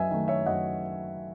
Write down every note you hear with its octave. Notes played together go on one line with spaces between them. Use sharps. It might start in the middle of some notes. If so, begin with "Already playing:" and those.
Already playing: F#2 B4 D#5 E5 G#5
D#3 A3
C#5 E5
F#2 D#5 F#5